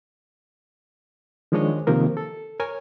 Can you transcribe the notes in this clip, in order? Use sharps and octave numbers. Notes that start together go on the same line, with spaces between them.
D#3 F3 G#3 D4 C#5 D#5
C3 D#3 F3 A#3 A#4
A4
A#4 C#5 G#5